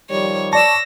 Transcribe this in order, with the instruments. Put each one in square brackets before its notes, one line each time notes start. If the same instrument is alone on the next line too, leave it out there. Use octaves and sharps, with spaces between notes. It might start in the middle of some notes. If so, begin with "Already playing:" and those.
[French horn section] D#3 F3 G3 [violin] C#5
[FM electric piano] D5 C#6 [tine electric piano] A5 [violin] E6 A#6